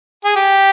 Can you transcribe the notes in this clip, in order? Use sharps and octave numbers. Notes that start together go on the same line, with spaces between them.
G#4
G4